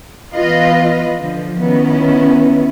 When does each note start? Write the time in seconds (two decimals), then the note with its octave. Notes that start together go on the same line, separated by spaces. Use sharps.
0.33 E3 B3 F4 B4 D#5
1.18 D3 F3
1.60 D#3 B3 C#4 E4